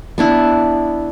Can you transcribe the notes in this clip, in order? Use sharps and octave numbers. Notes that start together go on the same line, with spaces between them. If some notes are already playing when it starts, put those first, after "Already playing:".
B3 D4 E4